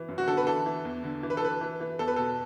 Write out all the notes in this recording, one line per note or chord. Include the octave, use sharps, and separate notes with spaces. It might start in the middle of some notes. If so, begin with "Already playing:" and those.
Already playing: E3
F#2
F#4
D3 A4
B4
E3 A4
E3
E2
D3
E3
B4
A4
E3 B4
E3
E3
E2 A4
B4
B2 A4